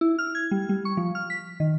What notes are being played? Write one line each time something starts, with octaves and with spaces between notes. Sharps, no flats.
E4
F6
G#6
G3
G3
C#6
F3
F6
B6
D#3